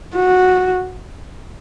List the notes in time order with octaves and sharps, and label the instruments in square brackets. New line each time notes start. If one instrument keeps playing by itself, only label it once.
[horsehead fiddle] F#4